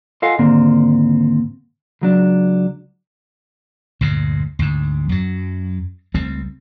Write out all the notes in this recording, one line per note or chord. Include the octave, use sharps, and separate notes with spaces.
F4 A4 D#5 F5 F#5 G#5
D#2 G#2 D3 A#3 C4
C#2 F#3 D4
D2 G2 A#2
D2 G#2
F#2 F#3
C#2 G3 A3 C4